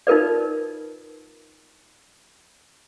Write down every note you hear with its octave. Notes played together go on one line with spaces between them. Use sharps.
D#4 F4 A#4 B4 D5